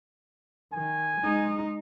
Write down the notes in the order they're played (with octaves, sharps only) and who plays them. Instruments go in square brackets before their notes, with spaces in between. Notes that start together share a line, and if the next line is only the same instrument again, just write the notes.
[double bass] D#3 [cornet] G#5
[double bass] G#3 D#4